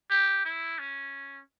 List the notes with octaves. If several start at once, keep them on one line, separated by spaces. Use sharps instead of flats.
G4
E4
C#4